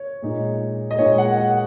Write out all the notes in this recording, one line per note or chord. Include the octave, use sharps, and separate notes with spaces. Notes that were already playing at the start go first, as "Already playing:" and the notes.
Already playing: C#5
A#2 G#3 D#4
D#5
A#2 G#3 D#4 C#5
F#5
F#5